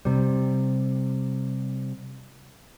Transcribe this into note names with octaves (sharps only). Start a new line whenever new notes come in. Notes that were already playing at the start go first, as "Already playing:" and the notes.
C3 G3